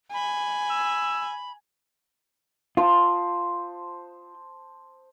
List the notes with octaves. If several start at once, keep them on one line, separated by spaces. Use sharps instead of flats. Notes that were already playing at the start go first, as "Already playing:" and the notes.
G#5 B5
E6
F4 C5 A5 D#6